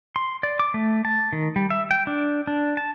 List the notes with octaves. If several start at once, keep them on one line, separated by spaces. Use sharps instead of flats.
C6
D5
D6
A3
A5
D#3
G3
E5
G5
D4
D4
A5